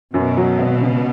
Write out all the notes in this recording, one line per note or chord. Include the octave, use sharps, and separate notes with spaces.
F#2 B2
F#3
G#1
C#3